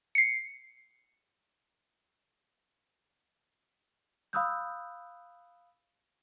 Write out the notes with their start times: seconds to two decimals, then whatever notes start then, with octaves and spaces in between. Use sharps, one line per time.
0.15 C7 C#7
4.33 F5 B5 D#6 E6 F#6 G6